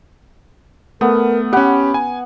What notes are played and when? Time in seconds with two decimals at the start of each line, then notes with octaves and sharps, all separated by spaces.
1.01 A3 B3 A#4
1.53 C#4 G4 F#5 B5
1.94 G#5